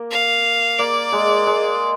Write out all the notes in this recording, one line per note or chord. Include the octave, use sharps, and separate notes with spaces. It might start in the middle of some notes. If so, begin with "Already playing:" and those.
Already playing: A#3
F5
A#3 D5
G#3
G#3